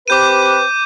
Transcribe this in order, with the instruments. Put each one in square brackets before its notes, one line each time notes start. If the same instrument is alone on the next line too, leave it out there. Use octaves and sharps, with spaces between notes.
[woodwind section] C4 G4 B4 [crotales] D6 G6 D#7